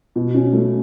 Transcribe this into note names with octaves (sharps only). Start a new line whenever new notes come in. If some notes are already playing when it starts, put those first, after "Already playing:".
B2
C#4
A3